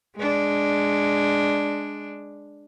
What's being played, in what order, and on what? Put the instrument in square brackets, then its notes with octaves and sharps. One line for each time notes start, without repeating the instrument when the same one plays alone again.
[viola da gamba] G#3 D4